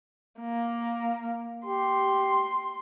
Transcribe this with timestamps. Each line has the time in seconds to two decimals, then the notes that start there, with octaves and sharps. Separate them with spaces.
0.40 A#3
1.66 G4 C6